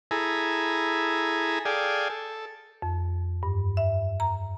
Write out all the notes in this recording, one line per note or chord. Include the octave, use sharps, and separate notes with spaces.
E4 G#4 A4 G#5 A#5 B5
G#4 A4 D5 F5 G5 G#5
A4
F2
G2
E5
A#5